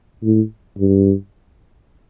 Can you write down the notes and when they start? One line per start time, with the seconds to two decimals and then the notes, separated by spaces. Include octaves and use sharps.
0.23 A2
0.78 G2